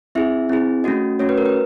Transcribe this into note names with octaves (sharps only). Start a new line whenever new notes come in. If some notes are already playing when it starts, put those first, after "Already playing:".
C4 E4 G#4 E5
C4 E4 G#4
A3 C#4 F#4 D#5
A3 C#4 F#4 C#5
B4
A#4
B4